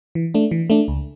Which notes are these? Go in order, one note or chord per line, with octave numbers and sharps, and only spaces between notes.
E3
A3 D4
E3
A3 D4
C#2